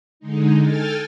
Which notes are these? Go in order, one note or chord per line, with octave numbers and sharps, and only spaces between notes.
D3 G#3 D#4
A4 G5 G#5 F6 A6